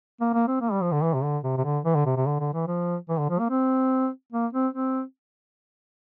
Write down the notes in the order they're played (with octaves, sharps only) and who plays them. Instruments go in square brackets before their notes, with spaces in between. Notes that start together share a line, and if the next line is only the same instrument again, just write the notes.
[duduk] A#3
A#3
C4
A#3
G3
F3
D3
E3
C3
D3
C3
C3
D3
E3
D3
C3
C3
D3
D3
E3
F3
E3
D3
F3
A#3
C4
A#3
C4
C4